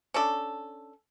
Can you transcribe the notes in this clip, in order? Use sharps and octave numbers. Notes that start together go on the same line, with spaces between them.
C#4 D4 A4